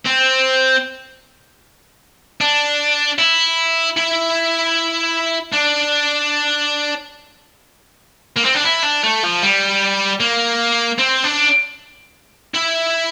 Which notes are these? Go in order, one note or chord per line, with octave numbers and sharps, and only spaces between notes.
C4
D4
E4
E4
D4
A#3
C4
D4
E4
D4
A3
F3
G3
A#3
C4
D4
E4